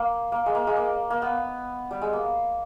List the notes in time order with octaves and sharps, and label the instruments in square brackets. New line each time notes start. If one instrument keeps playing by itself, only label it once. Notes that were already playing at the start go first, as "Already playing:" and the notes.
Already playing: [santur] A#3
A#3
G#3
A#3
G#3
A#3
A#3
B3
G3
G#3
A#3